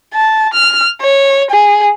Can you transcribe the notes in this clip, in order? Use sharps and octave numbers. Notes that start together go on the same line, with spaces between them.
A5
F6
C#5
G#4